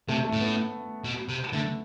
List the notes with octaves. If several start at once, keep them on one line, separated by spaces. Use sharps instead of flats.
C3 A3
A3
A2
B3
B2
C3
D3 A3